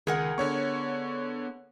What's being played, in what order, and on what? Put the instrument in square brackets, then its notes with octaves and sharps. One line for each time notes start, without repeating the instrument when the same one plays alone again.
[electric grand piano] C#2 [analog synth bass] D#3 [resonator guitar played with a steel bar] G#4 A#4 F#5
[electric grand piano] D3 C#5 C#6 [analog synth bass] B3